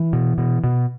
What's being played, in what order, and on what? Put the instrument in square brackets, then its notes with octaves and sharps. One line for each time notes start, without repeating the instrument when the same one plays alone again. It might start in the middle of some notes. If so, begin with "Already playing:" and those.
Already playing: [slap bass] E3
B2
B2
B2